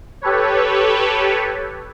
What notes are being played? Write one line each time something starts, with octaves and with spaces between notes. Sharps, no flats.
G4 A4 B4 C#5